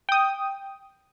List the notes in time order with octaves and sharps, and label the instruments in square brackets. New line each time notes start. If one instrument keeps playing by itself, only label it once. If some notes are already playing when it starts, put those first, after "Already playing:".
[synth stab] G5 D#6